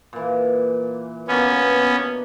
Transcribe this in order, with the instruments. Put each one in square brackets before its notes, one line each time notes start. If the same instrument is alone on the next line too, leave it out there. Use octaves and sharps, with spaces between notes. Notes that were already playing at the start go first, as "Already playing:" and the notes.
[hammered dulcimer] A#2 E3
[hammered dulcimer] B2 A#3 D4 [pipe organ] B3 C#4